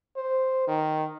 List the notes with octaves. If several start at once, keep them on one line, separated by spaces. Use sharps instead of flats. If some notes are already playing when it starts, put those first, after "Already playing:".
C5
D#3